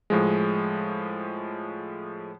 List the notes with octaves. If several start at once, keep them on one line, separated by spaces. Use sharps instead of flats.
A2 F3 G#3